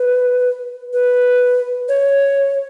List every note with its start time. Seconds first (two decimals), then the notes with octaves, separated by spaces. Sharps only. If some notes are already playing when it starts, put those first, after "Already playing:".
Already playing: B4
0.93 B4
1.89 C#5